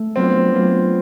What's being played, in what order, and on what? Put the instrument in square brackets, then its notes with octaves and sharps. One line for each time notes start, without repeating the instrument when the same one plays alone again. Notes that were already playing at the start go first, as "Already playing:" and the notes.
Already playing: [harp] A3
[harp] F#3 B3 D4 F4 [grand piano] C4
[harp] F#3 B3 D4 F4